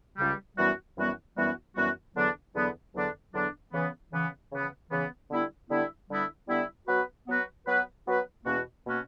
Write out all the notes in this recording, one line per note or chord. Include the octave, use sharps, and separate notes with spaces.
C#2 C#3 G3
F#2 E3 G3 B3 F#4
F#2 E3 G3 B3 F#4
F#2 E3 G3 B3 F#4
F#2 E3 G3 B3 F#4
E2 D3 F#3 B3 D4
E2 D3 F#3 B3 D4
E2 D3 F#3 B3 D4
E2 D3 F#3 B3 D4
C#3 E3 B3
C#3 E3 B3
C#3 E3 B3
C#3 E3 B3
D3 G3 B3 E4
D3 G3 B3 E4
D3 G3 B3 E4
D3 G3 B3 E4
F#3 B3 F#4 B4
F#3 B3 F#4 B4
F#3 B3 F#4 B4
F#3 B3 F#4 B4
E2 B2 A#3 C#4 F#4
B2 A#3 C#4 F#4